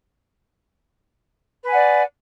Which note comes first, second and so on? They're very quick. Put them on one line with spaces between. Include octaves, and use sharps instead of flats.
B4 G#5 F#5 D5